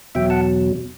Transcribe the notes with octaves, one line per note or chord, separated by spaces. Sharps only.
E2 B2 F#3 E5 G5
F#5 A5